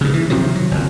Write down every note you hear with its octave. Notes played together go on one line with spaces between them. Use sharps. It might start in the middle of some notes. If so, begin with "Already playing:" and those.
G2 C#3
E3
C3 D#3 F3 F#3
F#3
F#1 F2